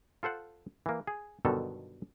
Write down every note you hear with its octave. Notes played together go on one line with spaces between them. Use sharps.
F4 A4 C5 F#5
E3 A#3
G#4
G1 B2 D3 D#3 F#3 A4